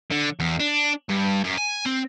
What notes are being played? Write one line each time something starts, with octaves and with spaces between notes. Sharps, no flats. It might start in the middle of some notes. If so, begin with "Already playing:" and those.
D3
E2
D4
G2
F#2
G#5
C4